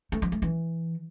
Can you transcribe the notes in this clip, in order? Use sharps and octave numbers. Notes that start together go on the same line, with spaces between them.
A3
F3
A3
E3